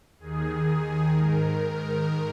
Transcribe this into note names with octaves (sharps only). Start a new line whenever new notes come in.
D#2 D#3 G#4
G#4
G#2 D#3 A#4